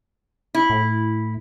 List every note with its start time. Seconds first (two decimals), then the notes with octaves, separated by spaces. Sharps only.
0.55 E4
0.70 A2